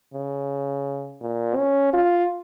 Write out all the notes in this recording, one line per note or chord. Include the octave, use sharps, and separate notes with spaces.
C#3
A#2
C#4
F4